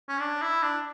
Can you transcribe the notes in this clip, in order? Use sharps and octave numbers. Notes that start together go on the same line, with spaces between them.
C#4
D4
E4
D4